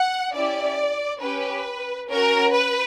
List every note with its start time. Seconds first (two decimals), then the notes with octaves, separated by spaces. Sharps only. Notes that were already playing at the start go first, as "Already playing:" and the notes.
Already playing: F#5
0.34 C#4 E4 G4 D5
1.22 C#4 G4 B4
2.10 C#4 F#4 A#4
2.53 B4